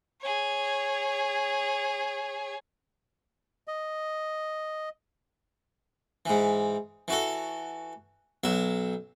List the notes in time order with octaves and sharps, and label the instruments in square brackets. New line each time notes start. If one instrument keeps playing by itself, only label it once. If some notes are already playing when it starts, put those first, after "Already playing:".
[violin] G#4 C#5
[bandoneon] D#5
[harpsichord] G#2 E3
E3 F#4 A4
B1 F#3 E5